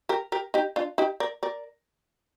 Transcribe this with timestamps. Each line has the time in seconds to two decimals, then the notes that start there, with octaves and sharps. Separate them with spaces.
0.09 G4 A#4
0.32 G4 A#4
0.54 D#4 G4
0.76 D4 F4
0.98 D#4 G4
1.20 A#4 D5
1.43 A#4 D5